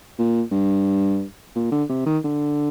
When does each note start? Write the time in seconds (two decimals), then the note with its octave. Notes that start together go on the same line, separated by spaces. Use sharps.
0.18 A#2
0.51 G2
1.56 A#2
1.72 D3
1.89 C3
2.06 D#3
2.24 D3